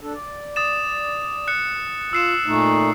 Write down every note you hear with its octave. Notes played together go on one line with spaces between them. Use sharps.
D4 A4
D5
D#6 A6 E7
F#6 C#7
F4 E6 C7 E7
A#2 A3 D#4